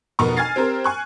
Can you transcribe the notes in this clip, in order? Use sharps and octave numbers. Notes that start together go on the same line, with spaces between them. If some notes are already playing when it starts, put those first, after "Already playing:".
F1 B2 F#4 A#4 C#6
G#5 F6 G#6 A6 C7
C4 G4 A#4 C5
G#5 C#6 F#6